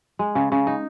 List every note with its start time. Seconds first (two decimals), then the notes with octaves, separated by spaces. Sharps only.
0.19 G#3
0.35 C#3
0.52 C#3
0.67 D#4